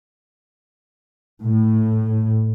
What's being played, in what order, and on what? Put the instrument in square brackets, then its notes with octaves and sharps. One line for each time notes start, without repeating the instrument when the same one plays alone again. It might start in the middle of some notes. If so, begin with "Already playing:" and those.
[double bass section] A2